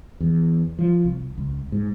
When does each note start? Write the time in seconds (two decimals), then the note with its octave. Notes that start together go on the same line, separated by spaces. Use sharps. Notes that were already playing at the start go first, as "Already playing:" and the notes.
0.20 E2
0.79 F3
1.05 C2
1.38 C#2
1.72 G#2